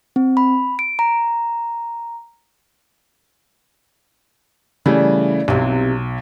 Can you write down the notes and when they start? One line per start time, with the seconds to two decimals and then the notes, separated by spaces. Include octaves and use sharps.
0.16 C4
0.37 B5
0.79 D7
0.99 A#5
4.86 C#3 E3 G3 A3
5.48 B1 C3 E3